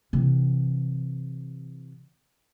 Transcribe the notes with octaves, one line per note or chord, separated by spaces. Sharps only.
C3 E3